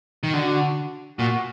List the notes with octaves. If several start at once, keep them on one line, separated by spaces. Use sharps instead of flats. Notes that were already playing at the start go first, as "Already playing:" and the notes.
D#3
D3 F#4
A#2 F#4